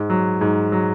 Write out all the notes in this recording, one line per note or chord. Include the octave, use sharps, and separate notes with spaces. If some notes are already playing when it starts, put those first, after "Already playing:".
Already playing: G#2
F#3
G#2
F#3